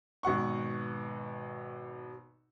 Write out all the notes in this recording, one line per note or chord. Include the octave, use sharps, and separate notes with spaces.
G#1 B2 F#5 C#6